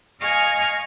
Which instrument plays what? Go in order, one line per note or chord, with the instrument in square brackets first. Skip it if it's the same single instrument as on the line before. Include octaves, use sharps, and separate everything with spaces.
[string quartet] D#5 F5 G#5 C#6 F6